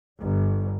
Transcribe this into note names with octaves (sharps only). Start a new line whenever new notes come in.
G1